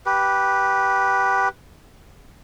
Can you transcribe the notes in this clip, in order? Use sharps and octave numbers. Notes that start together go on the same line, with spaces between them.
G4 B4